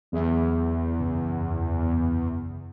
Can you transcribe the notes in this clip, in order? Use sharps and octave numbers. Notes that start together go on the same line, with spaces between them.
E2 F#3 G#4 E5
B1 F#2 C#3